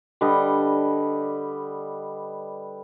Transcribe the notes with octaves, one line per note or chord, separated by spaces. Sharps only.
D3 G3 B4 D#5